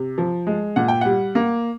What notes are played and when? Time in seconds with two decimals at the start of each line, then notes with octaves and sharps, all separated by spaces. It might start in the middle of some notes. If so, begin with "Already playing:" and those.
Already playing: C3
0.18 F3
0.47 G#3
0.76 A#2 F#5
0.88 G5
1.01 G3 F#5
1.35 A#3